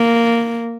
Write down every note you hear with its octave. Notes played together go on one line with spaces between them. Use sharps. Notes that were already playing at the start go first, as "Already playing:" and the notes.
Already playing: A#3